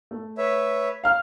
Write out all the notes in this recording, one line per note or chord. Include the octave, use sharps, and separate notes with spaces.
A3
B4 C#5 E5
F5 F6